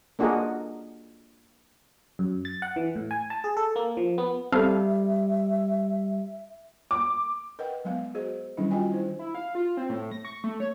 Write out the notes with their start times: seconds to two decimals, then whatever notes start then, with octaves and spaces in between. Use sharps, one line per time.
0.19 A#3 D4 F#4 G#4 A#4 D#5
2.19 F#2
2.45 A6
2.62 F#5
2.76 E3
2.95 A2
3.11 G#5
3.30 A5
3.44 G#4
3.57 A4
3.76 A#3
3.97 F3
4.18 B3
4.52 G3 C4 A4 E5 F5
6.91 D6
7.59 A#4 B4 D#5 F#5 G5
7.85 F#3 G#3 B3 F5
8.14 F#4 G#4 C5 D#5
8.57 D#3 F#3 G3 C#4 D4 E4
8.71 D4 F4 F#4 D#5 G5 G#5
8.92 E4 C5
9.19 E4
9.35 F5
9.55 F4
9.77 C4
9.89 A2
10.12 A#6
10.25 C#6
10.44 A3
10.60 C#5